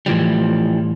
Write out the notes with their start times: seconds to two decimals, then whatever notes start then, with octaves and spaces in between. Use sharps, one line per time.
0.06 A2 E3 F3 G3